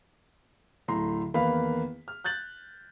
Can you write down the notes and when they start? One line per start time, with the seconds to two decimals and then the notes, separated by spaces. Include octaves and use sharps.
0.88 D1 A2 A#5 C6
1.34 E2 D#3 A#3 B4 F5 B5
2.08 F6
2.24 F#6 G6 A6 F#7